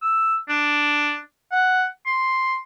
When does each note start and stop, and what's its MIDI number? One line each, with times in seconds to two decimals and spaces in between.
0.02 0.35 88
0.49 1.17 62
1.52 1.86 78
2.06 2.57 84